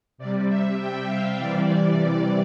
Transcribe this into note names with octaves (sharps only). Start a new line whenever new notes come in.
C3 G3 D5
E5
G5
F5
C3 E3 G3 D5